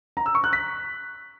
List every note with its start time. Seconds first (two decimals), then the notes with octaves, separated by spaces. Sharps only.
0.17 A#5
0.26 E6
0.35 C#6
0.44 F#6
0.53 B6